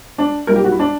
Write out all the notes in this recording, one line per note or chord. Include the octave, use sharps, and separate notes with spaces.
D4
B1 A#2 G3 A#4
G4
F#4
E4
D4